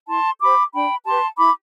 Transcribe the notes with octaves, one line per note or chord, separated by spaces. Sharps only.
E4 A5 C6
G4 C5 B5 D6
D4 G5 B5
G4 A5 C6
B4
E4 B5 D6